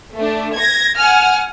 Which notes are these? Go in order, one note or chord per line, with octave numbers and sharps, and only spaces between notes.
A3 D4
G#6 A#6
F#5 G#5 F6